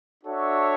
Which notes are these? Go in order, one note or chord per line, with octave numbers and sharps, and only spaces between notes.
D4 F#4 A4 C#5 E5